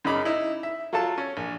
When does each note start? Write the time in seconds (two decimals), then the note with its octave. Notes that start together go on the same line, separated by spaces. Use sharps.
0.05 F#2 C#3 D#4 B5 D6
0.25 D#4 E4
0.63 E5
0.93 F#3 F4 A4 A5
1.18 C#4
1.37 A#1